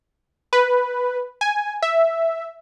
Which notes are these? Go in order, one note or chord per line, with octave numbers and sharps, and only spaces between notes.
B4
G#5
E5